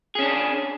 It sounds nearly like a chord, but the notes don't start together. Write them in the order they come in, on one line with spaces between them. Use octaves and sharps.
G#4 C#4 D4